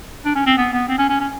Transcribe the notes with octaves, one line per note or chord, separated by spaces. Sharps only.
D4
C#4
C4
B3
B3
C4
C#4
C#4
C#4